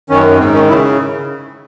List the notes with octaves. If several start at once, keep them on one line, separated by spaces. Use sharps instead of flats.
F#2 D#3 C#4
G#2 D#3 C4
C#4
C#3 E4